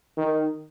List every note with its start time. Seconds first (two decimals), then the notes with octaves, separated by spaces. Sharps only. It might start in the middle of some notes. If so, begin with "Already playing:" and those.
0.17 D#3